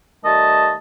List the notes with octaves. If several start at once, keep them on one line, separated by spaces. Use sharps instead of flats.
D#3 G3 A3 D#5 A5